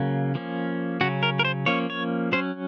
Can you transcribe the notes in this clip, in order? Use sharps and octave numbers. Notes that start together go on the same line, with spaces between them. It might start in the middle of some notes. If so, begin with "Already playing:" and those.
Already playing: C#3 F#3 A#3 C#4
F3 A#3 C#4
C#3 F#3 C#4 F#4
A#4
A#4
C5
F3 A#3 C#4 C#5
C#5
F#3 C#4 C5